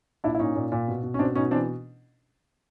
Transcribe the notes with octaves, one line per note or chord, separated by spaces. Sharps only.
A#2 D4 E4
E4
A#2 C#4 D#4
A#2
A#2
B2
B2
C#4
B2 C4 D4
B2 C#4 D#4
E3 C4 D4